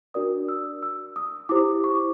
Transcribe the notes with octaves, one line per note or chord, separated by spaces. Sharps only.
D4 F#4 A#4 D5 D#6
E6
E6
D#6
E4 G4 C5 D6
C#6